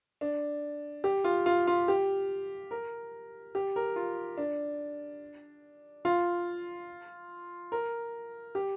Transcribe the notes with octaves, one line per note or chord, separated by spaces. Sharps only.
D4
G4
F4
F4
F4
G4
A#4
G4
A#4
F4
D4
F4
A#4
G4